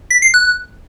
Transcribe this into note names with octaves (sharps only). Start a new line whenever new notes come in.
B6
C7
F#6